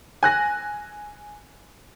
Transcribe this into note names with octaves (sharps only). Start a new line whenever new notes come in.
G#5 F#6 A#6